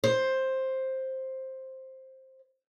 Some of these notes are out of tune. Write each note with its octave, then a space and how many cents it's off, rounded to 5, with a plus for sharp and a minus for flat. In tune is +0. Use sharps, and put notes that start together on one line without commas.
C5 +10